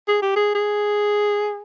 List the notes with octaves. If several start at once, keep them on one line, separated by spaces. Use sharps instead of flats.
G#4
G4
G#4
G#4